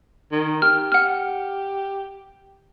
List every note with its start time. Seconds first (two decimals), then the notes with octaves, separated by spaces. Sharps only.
0.32 D#3
0.62 G4 F6
0.92 F#5 F6